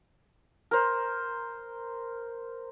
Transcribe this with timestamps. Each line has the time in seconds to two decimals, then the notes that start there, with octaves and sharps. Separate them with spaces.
0.71 A#4 C5